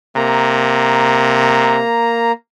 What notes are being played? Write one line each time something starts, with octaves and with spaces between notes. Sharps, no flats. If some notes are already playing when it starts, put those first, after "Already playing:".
C3 A#3 A#5